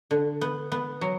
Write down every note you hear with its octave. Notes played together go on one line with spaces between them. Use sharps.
D3
B3
B3
F#3